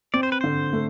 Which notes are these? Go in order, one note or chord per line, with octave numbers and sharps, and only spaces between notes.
C4 D5
C5
B4
D3 C5
A3